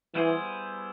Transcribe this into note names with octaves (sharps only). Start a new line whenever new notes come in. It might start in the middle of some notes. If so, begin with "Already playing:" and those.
E3 G3 B3 E4 G#4 C5